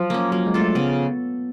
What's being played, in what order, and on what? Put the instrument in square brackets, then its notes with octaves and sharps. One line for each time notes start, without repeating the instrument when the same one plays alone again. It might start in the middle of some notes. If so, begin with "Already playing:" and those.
Already playing: [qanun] F3 [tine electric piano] F#3
[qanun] A#3 C#4
[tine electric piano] F#3 [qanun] A#3
[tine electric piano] G#3
[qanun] D4 F4 A4
[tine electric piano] A3
[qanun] C#3 [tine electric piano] B3